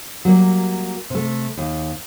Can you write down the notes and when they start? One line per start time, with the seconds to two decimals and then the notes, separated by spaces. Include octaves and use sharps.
0.25 F#3 G3 A#3
1.10 C3 A3
1.58 D#2